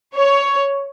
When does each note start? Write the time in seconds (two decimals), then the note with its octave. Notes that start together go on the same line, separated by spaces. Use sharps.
0.14 C#5